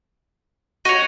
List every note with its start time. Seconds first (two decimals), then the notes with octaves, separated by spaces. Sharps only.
0.85 F#4 C#5 D#5